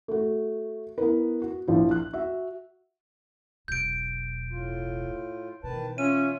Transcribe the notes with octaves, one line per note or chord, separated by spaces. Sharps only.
A3 F#4
B3 E4 A#4 B4
F#4
A#1 F3 E4
F#6
F#4 E5
E1 B1 G6 D7
A2 F4
B2 D#3 E3 B4 A5
C#4 F4 C#5 E5 D#7